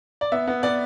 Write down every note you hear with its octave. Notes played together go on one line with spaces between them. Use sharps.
D5
B3 E5
B3
B3 D5